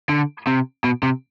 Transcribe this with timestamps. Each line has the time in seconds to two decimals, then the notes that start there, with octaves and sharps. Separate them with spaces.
0.09 D3
0.47 C3
0.84 B2
1.03 C3